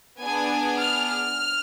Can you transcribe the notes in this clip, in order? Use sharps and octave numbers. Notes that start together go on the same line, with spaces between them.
B3 D4 G#4 G#5
F6